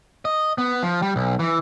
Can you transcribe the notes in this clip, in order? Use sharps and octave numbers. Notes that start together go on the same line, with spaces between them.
D#5
B3
F3
G3
B1
E3